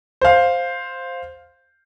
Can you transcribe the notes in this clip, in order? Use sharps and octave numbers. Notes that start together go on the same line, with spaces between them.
C5 F5